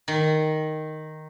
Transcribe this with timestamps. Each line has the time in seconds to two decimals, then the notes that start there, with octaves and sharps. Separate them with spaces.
0.08 D#3